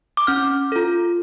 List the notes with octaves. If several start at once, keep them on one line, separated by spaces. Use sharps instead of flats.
D6
C#4 F6
F4 A4